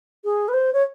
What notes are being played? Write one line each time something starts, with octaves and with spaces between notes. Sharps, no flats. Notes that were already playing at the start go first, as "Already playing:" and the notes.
G#4
B4
C5
C#5